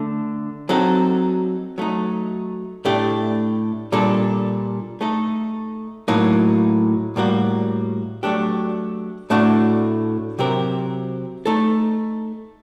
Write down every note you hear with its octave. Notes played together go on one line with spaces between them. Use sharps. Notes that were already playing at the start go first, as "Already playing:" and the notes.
Already playing: D3 A3 D4 A4
F#3 C4 D#4 A4
F#3 A3 D#4
A2 A3 D4 G4
A#2 G3 D4 A4
A3 D#4 A4
A2 F#3 A#3 D#4
A2 G3 A#3 F#4
F#3 A3 D4 G4
A2 A3 D4 F#4
C3 F#3 C4 G4 A#4
A3 D#4 A4